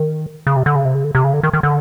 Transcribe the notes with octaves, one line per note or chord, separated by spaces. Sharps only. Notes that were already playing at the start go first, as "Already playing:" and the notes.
Already playing: D#3
C#3
C3
D3
C#3
C3
C#3
D3
C3
C#3
D3
D#3
D#3
D3